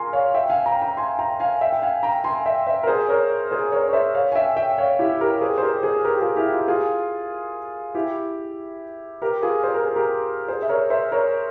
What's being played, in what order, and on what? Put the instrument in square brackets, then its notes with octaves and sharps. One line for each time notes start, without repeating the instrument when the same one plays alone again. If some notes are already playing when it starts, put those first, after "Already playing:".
Already playing: [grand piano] F4 G#4 A#4 G#5 C6
C#5 F5
E5 G5
F5 G#5
G5 A#5
G5 A#5
G#5 C6
G5 A#5
F5 G#5
E5 G5
G5
F5 G#5
G5 A#5
G#5 C6
E5 G5
C5 E5
A#4
G#4 C5
A#4 C#5
G#4 C5
A#4 C#5
C#5
C5 E5
C#5 F5
G#5
E5 G5
E5 G5
C#5 F5
E4 G4
G4 A#4
G#4 C5
C5
G4 A#4
G#4 C5
G4 A#4
G4
F4 G#4
E4 G4
F4
F4 G#4
E4 G4
G4 A#4
F4 G#4
C5
A#4
G#4
G4 A#4
G#4 C5
E5
A#4 C#5
C5 E5
A#4 C#5